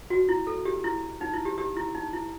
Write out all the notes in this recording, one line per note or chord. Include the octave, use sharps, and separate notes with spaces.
F#4
E4
A4
G4
E4
D#4
E4
G4
G4
E4
D#4
E4